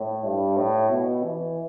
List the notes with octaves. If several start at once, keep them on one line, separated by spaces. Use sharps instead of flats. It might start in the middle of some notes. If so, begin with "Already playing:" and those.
Already playing: A2
G2
A2
B2
E3